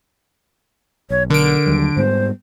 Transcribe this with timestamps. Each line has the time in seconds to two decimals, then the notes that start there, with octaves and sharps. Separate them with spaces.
1.10 B1 C#5
1.30 D3 A#4 D7
1.66 D#2 F#3 G3
1.97 G#2 G3 B3 C5